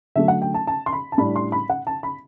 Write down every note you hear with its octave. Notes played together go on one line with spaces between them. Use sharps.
D3 F#3 A3 E5
F#5
G5
A5
A5
C6
B5
A5
A2 G3 D4 B5
C6
B5
F#5
A5
B5